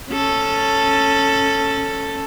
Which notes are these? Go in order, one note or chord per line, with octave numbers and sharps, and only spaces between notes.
C#4 A4